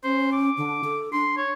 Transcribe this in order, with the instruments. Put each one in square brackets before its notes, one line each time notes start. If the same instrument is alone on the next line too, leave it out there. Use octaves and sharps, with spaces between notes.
[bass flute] C#4 [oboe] C5
[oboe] D6
[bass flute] D3
A4
[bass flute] D4 [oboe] C6
[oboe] C#5